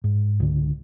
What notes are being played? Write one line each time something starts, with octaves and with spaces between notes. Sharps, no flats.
G#2
C#2 D3